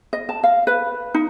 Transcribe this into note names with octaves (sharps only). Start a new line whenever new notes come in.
D#5
A5
F5
B4
D#4